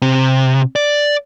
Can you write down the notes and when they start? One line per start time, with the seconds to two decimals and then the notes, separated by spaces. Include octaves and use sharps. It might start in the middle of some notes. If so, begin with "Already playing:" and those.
0.02 C3
0.76 D5